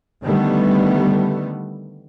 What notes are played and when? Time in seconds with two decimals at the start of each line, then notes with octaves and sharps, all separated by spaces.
0.23 D3 D#3 G3 A3 B3